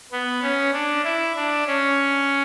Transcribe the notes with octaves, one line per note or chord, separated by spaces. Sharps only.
B3
C#4
D4
E4
D4
C#4